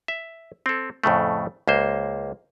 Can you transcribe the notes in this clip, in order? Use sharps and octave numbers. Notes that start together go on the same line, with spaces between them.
E5
C4 A4
F2 A2 C#3 A3
C#2 A#3 C5